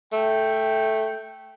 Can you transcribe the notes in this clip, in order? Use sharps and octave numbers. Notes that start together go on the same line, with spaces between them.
A3 G5